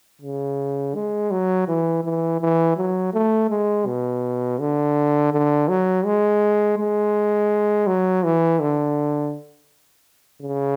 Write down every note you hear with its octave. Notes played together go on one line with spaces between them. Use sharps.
C#3
G#3
F#3
E3
E3
E3
F#3
A3
G#3
B2
D3
D3
F#3
G#3
G#3
F#3
E3
D3
C#3